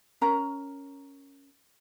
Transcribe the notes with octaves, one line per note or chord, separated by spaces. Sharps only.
C#4 A#4 A#5